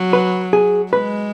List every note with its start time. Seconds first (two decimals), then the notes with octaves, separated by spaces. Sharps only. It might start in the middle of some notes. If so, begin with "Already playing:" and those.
Already playing: F#3
0.13 B4
0.53 G#4
0.92 G#3 B4